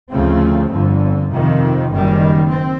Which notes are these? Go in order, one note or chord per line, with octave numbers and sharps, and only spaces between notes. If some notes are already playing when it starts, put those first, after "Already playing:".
D2 C#3 F3 A3 C4
G1 F2 D3
F2 C3 D#3
F#1 F#2 D#3 G3
C4